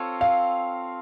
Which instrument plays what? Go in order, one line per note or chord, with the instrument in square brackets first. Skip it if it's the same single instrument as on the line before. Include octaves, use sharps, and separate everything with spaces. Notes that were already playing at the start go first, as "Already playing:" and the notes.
Already playing: [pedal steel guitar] C4 F4 A4 C#5
[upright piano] F5